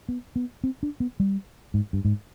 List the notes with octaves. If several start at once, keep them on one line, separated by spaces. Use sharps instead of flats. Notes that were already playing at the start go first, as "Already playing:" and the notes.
B3
B3
C4
D4
B3
G3
G#2
G2
G#2